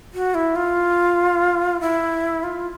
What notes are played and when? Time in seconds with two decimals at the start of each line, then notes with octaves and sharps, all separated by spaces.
0.14 F#4
0.35 E4
0.56 F4
1.81 E4
2.43 F4